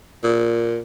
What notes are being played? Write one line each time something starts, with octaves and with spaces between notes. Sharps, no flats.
A#2